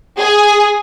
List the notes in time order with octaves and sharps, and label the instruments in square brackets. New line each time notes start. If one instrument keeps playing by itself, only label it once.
[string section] G#4